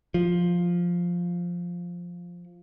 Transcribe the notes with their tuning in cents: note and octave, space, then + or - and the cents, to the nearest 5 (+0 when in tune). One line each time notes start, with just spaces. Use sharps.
F3 +5